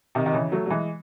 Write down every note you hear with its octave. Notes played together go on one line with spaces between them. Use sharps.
C3 D#3
D#3
C#3 E3
F#3 A3
F#3
E3 G#3